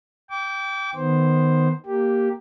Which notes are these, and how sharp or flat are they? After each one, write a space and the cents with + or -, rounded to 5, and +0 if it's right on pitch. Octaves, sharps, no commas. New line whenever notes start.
G5 +0 D6 -30
D#3 +0 B3 +10 C5 +5
A#3 +0 G4 +0